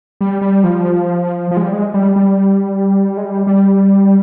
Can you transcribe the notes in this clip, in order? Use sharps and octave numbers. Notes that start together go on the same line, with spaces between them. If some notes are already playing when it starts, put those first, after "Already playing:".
G3
G3
F3
F3
G#3
G3
G#3
G3
G3
G#3
G3
G3